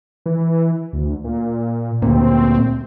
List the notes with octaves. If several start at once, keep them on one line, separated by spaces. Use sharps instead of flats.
E3
D2
A#2
D2 A#2 C4